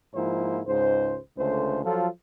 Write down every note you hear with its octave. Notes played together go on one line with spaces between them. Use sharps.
G#2 F3 A#3 E4 C5
C#2 G#2 C5
C#2 D3 A3 C5
F3 F#3 F4 A4